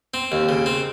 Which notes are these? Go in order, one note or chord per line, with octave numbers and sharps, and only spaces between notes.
C4
D#2
C#3
C4